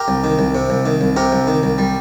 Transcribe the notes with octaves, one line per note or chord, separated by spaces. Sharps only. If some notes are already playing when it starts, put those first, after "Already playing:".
Already playing: G4 A#4
C2
D#3
C2
C3
C2
D#3
C2
C3 G4 A#4
C2
D#3
C2
G3